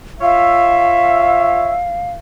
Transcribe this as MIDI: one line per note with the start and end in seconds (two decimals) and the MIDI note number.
0.21 1.75 65
0.21 1.75 73
0.21 1.75 76
0.21 2.11 77